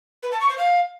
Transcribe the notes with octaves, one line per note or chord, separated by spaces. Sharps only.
B4
A5
C#6
C5
F5